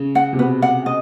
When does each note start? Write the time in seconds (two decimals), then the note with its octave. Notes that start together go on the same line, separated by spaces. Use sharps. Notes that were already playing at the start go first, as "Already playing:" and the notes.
Already playing: C#3
0.15 F#5
0.33 C3
0.39 B2 B4
0.62 F#5
0.86 D#5